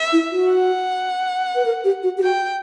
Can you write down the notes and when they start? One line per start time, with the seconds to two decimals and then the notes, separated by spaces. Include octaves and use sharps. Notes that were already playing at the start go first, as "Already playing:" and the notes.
Already playing: E5
0.12 E4
0.31 F#4
0.51 F#5
1.55 B4
1.65 A#4
1.84 G4
2.03 F#4
2.18 G4
2.22 F#4 G5